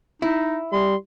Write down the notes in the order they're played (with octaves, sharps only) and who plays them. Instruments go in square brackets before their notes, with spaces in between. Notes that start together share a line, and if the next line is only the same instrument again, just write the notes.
[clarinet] D#4 [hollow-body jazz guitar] E4
[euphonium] G3 [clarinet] C6